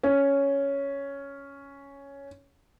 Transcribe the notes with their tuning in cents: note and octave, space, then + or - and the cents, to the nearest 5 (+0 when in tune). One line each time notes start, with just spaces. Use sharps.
C#4 +5